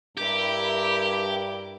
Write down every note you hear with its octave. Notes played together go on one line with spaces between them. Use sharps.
G2 E4 G4 A#4